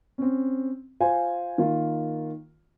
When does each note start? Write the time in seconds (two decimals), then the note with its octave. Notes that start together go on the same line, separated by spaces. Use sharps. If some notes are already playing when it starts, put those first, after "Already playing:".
0.18 C4 C#4
1.00 F4 C5 F5 G#5
1.58 D#3 A#3 F4